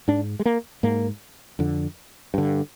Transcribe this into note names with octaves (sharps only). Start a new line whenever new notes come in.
G#2 D4
G#3
A#3
G#2 A#3
F2 D3
G2 D3